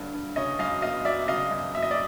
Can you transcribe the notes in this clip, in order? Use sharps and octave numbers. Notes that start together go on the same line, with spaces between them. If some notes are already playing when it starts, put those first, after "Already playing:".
Already playing: G2 D3 F#3
G2
C#3 C#5 D#5
F#2 D#5 F5
G1 D#5 F5
F#3 D5 E5
C#3 D#5 F5
F#2
F#1 E5
D#5
D5 E5